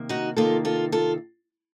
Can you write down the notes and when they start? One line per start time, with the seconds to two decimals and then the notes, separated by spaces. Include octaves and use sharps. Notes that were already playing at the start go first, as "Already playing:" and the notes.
Already playing: C3 D#3 A#3
0.09 D#4 F#4
0.37 C3 D#3 A#3 F4 A4
0.65 F4 A4
0.92 F4 A4